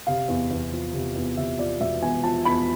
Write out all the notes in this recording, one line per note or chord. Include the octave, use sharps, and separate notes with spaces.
C3 F5
E2
E2
F3
C3
E2
C3 E5
F3 D5
E1 E5
E2 G#5
F3 A5
E2 B5